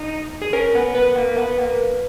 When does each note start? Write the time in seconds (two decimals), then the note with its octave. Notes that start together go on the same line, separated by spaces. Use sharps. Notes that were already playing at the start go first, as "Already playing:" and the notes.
Already playing: D#4
0.42 G#4
0.53 C#4 A#4
0.75 B3
0.95 B3 B4
1.16 A#3
1.37 B3
1.59 A#3